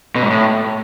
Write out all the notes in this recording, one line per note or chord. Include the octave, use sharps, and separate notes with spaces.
B2
G#2
A2